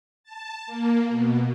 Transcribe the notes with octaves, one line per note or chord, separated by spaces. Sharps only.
A5
A#3
B2